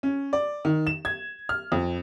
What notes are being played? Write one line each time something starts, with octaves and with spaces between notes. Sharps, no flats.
C#4
D5
D#3
E7
G#6
F6
F2